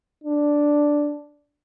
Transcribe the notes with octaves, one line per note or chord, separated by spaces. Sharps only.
D4